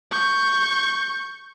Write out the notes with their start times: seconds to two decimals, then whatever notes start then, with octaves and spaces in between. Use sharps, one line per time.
0.11 C#6 G6